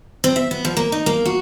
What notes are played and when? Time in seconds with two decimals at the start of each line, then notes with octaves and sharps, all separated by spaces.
0.24 C4
0.36 E5
0.51 B3
0.65 F3
0.77 A#3
0.92 D#4
1.06 A#3
1.26 F#4